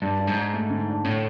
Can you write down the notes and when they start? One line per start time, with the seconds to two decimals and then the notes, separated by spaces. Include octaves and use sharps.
0.02 G2 D4
0.19 D4
0.27 G#2
0.36 D4
0.53 A3
0.70 D3
0.88 D4
1.04 A2 D3